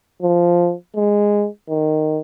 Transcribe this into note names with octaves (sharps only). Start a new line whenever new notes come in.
F3
G#3
D#3